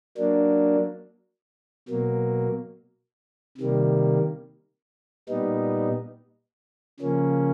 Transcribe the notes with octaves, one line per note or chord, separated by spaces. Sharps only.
F#3 A#3 D4
B2 F#3 A#3
C3 D#3 G3 A#3
A#2 G3 B3 D#4
C#3 F3 A#3 C#4